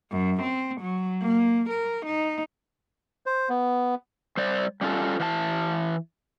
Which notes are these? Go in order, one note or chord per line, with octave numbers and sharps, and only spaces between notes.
F#2
C4
F#3
A#3
A#4
D#4
C5
B3
G3 C5 D5
G3 C#4 F4 A4
E3 F5 A5